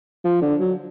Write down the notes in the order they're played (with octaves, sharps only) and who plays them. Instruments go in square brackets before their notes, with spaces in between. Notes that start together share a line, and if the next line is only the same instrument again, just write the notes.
[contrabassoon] F3
D3
F#3